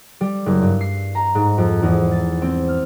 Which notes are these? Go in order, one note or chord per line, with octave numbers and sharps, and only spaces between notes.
G3
F#1
G2
C7
A#5
G#2
F2
E2
A6
C4
F6